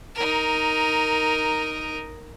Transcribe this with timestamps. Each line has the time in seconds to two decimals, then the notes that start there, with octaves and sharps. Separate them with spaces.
0.15 D#4 A#4